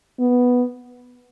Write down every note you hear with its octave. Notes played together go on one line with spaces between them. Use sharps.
B3